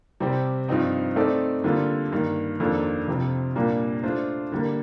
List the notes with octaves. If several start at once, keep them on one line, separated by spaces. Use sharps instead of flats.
C3 G3 C4 G4
G2 F3 C4 D#4
A3 C4 D#4 A4 D5
D3 G3 A#3 F4 A4
G2 D#3 A#3
F2 D#3 A#3 D4 A4
F2 C3 F3 C4 F4
A#2 G3 A#3 D4 G4
A3 D4 F4 C5
D3 G3 A#3